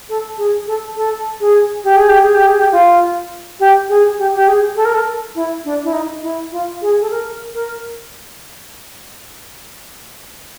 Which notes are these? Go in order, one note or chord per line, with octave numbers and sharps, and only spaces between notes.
A4
G#4
A4
A4
G#4
G4
G#4
G4
G#4
G4
G#4
G4
F4
G4
G#4
G4
G4
G#4
A4
A#4
A4
E4
D4
E4
D#4
E4
F4
G#4
A4
A#4
A#4